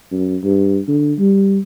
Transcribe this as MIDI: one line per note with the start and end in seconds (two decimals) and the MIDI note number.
0.12 0.37 42
0.44 0.79 43
0.88 1.14 50
1.19 1.59 55